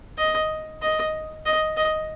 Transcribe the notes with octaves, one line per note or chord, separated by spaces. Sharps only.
D#5
D#5
D#5
D#5